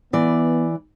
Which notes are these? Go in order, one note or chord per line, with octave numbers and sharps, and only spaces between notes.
E3 B3 D5